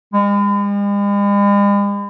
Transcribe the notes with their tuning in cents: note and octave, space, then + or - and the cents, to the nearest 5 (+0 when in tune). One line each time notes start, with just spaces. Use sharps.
G#3 -45